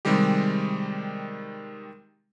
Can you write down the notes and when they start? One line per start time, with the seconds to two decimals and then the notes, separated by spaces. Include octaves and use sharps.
0.05 C3 D#3 G3 G#3 G4